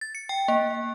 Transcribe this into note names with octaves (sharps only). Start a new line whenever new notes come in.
A6
C#7
G5
A#3